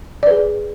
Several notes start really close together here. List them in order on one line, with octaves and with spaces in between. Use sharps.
D5 B4 G#4